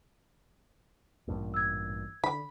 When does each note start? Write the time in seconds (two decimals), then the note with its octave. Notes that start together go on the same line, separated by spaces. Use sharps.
1.28 A1 G2 A#2
1.54 E6 G#6
2.24 D3 B5